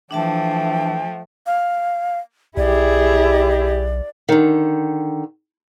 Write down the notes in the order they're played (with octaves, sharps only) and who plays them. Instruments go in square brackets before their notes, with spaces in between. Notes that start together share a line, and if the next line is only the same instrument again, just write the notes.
[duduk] E3 [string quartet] F3 A3 [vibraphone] D4 E5 A5 [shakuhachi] G5
[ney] F5
[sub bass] B1 [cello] E4 G#4 [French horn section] G4 [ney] D5
[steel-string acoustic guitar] D3 D#3